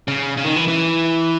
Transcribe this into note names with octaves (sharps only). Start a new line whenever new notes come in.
C#3
C#3
D#3
E3
E3